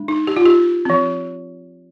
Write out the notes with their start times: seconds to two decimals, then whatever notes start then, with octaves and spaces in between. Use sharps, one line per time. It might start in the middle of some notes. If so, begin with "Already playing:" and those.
Already playing: G#3 D4
0.08 D#4
0.27 G4
0.36 F4
0.45 G4
0.85 F3 C4